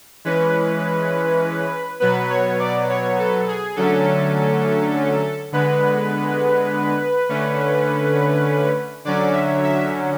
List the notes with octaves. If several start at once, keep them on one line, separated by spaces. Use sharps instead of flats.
E3 G#3 C#4 B4
B2 F#3 B3 B4
C#5
D5
C#5
A4
G#4
D3 F#3 A3 C#4 A4
D3 G#3 B3 B4
D3 A3 C#4
D3 F#3 C#4 D5
E5
E5